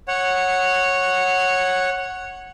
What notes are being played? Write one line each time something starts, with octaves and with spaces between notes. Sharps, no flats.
C#5 F#5